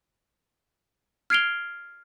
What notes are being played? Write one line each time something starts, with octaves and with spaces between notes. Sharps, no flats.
F6 G#6 C7 D7 F7 G7